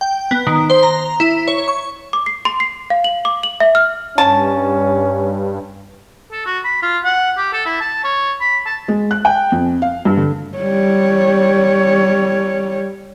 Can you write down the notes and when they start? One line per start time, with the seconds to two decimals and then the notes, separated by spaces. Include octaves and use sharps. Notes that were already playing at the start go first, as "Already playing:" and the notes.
0.01 G5
0.31 B3
0.47 D#3
0.70 C5
0.83 A#5
1.20 E4
1.48 C#5
1.68 C#6
2.13 D6
2.26 C7
2.45 C6
2.60 C7
2.90 F5
3.04 F#7
3.25 D6
3.43 F#7
3.60 E5
3.75 F6
4.18 G2 C#4 A5
6.32 A4
6.46 F#4
6.64 B5
6.82 F4
7.04 F#5
7.37 G4
7.53 A4
7.66 E4
7.80 A5
8.04 C#5
8.41 B5
8.66 A5
8.88 G#3
9.11 F#6
9.25 G5
9.52 F2
9.82 F5
10.05 G2
10.17 D3
10.58 G3 C#5